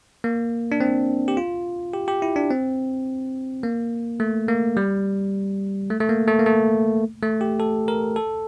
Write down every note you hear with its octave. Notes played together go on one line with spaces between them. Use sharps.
A#3
D4
C4
G4
F4
G4
G4
E4
D4
C4
A#3
A3
A#3
G3
A3
A3
A#3
A3
A#3
A3
A3
G4
A4
A#4
A4